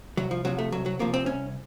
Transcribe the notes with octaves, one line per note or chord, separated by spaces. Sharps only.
C2 F#3
F3
C3 F3 F#3
A3
C2 F#3
F#3
C3 F3 A#3
C4
C2 C#4